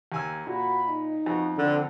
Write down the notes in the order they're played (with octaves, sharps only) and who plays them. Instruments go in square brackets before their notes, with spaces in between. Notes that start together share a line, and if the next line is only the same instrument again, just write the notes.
[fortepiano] D#2 G#5 E6
[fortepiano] A#2 [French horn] F#4 [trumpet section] B5
[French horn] D#4
[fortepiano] F2 [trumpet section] B3 F#4
[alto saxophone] D3 [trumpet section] C4 A4 F#5